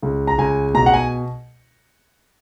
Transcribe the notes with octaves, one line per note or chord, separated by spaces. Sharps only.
C#2
A#5
C#2 G#5
B2 A#5
F#5
G#5